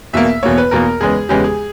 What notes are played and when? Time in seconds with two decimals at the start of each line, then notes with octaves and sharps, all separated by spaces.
0.13 E2 B2 A#3 E5
0.43 E2 B2 A#3 C#5
0.58 B4
0.71 E2 B2 A#3 A#4
1.01 E2 C#3 G#3 B3 G#4
1.29 E2 C#3 G#3 B3 G4
1.44 G#4